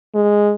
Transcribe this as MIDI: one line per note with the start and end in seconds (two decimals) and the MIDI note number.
0.15 0.53 56